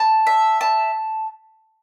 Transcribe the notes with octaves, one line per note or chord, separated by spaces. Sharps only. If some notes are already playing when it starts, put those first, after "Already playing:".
Already playing: A5
E5
A5